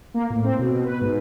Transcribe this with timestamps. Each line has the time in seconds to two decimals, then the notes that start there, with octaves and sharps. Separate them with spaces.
0.14 A#3
0.30 A2
0.44 C4
0.59 B2
0.73 B2
0.85 B4
1.01 G#2